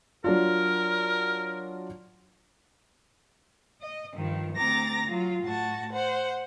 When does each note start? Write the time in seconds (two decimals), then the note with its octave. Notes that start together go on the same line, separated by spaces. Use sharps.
0.24 F#3 D4 F4 A#4
3.80 D#5
4.13 G2 D#3 F3
4.56 D2 C4 A#5 D6 A6 A#6
5.07 F#3 F4
5.43 A2 F#4 A5
5.92 C5 F#5